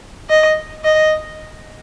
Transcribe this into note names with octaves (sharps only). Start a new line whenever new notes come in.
D#5
D#5